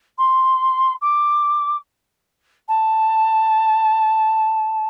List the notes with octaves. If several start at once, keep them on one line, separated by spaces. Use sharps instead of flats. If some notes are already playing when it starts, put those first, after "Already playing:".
C6
D6
A5